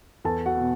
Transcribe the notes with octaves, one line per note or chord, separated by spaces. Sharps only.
E2 A4 A5
F#4 F#5
B2 B3